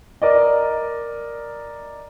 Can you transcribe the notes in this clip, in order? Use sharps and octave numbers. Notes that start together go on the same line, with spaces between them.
A#4 D5 D#5